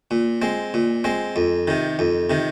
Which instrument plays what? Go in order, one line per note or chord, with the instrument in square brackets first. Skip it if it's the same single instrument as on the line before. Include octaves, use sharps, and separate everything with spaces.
[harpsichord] A#2
G#3 C4
A#2
G#3 C4
F2
C3 D#3
F2
C3 D#3